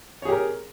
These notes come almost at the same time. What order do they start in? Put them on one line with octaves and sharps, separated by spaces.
C#5 G#4 G4 A#4